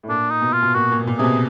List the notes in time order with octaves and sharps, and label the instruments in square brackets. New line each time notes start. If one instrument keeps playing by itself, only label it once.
[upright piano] A2
[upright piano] A#2 [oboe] D4
[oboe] D#4
[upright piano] B2
[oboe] F4
[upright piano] B2
[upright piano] A#2 [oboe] F#4
[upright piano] A#2
B2
A#2
[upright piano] C3 [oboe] G#4
[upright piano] B2